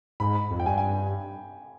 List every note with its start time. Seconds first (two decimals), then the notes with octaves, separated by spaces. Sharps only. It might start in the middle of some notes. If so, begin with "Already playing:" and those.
0.20 G#2 B5
0.51 F2
0.60 G5
0.66 G2 G#5
0.78 G#5